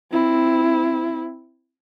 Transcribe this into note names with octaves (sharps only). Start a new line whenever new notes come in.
C4 E4